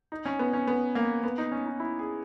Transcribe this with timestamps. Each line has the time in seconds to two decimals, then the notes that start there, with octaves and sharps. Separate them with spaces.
0.12 D#4
0.25 C#4
0.39 B3
0.53 C#4
0.67 B3
0.95 A#3
1.24 B3
1.38 D#4
1.52 C#4
1.66 D#4
1.80 E4
1.99 G#4